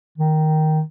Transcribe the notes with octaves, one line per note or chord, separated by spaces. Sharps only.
D#3